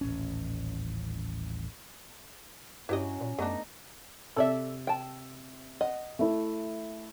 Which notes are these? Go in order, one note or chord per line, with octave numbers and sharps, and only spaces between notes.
D#1 A1 C#4
G2 F#3 C#4 E4 G4 D#5
A#2
F#2 A3 B3 D4 D#4
C3 A4 D5 E5 E6
G5 A5
D#5 F#5
A3 E4